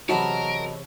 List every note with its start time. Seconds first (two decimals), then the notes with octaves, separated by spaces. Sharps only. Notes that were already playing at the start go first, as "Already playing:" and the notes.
0.09 E2 C3 F#3 C#4 A#4 D#5 A5 B5